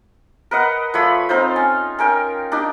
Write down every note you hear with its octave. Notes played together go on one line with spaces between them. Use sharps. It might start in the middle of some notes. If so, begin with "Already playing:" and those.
A#4 B4 D#5 F#5
F3 A3 C#5 B5
C4 D#4 F4 C5
C#4
C#4 A#4 G5
D4 D#4 G4